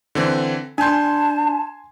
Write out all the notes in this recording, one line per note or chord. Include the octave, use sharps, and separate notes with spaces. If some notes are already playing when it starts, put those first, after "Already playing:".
D3 E3 C4
D4 G#5 A5 C6 G6